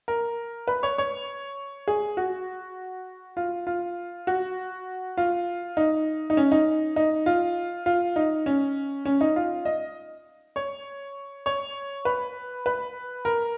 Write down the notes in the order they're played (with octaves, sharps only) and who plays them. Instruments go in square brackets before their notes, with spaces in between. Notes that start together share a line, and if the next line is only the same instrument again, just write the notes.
[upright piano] A#4
B4
C#5
C#5
G#4
F#4
F4
F4
F#4
F4
D#4
D#4
C#4
D#4
D#4
F4
F4
D#4
C#4
C#4
D#4
F4
D#5
C#5
C#5
B4
B4
A#4